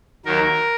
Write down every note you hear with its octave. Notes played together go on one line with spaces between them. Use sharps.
D#2 D#3 F#3 A#4